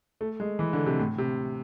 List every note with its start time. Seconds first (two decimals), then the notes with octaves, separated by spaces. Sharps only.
0.21 A3
0.40 G#3
0.59 E3
0.73 D3
0.86 C3
0.99 A2
1.18 C3